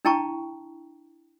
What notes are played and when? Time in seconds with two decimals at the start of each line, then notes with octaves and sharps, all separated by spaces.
0.05 D4 E4 G5 A5 A#5 C#6